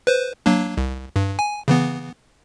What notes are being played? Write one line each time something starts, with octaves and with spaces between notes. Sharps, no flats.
B4 C5
F#3 A#3 D4
C2
G2
G#5
C#3 E3 B3